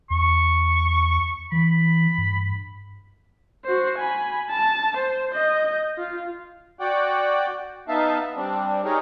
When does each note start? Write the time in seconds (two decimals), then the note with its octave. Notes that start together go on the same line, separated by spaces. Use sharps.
0.10 E2 C#6
1.52 E3 B5
2.18 G2
3.65 F#4 C5
3.98 G#5 B5
4.51 A5
4.97 C5
5.31 D#5 G6
5.99 F4
6.79 F#4 D5 F#5 G5
7.88 B3 D#4 E5 F5 A5
8.36 G3 C4 D4
8.84 D#4 G4 G#4 A#4 C#5